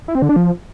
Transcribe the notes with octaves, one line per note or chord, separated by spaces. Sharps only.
E4
C4
D3
D4
F3